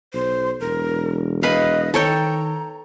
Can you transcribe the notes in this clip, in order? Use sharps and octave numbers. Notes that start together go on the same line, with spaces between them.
B1 C5
E1 A#4
B4 D#5 F5
D#3 A4 C#5 G5 A#5